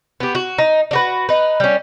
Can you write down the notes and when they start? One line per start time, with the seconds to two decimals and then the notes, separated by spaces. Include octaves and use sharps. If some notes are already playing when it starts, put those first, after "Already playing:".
0.20 B3 G4
0.35 F#4
0.58 D#4
0.91 D4 F#4 B4
1.29 D#4 B4
1.60 G3 C#4